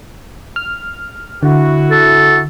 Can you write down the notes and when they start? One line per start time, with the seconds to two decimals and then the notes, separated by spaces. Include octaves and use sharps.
0.56 F6
1.43 D3 E4 F#4
1.91 A4